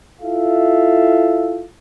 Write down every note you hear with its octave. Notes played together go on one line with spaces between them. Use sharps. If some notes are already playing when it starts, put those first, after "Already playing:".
E4 F4 A4 E5 F5